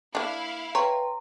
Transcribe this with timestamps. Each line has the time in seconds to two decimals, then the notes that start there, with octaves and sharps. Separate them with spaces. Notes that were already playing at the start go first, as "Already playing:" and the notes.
0.15 A#3 D4 E4 F5
0.75 B4 C#5 G5 A#5 C6